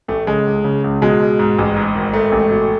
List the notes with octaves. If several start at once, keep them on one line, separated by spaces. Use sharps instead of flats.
A1 A3
C#3 G#3
C#2
C#3
C#2
B2 G#3
B2
G#2
A1
G#2
G#1
G#2 A3
A1
B2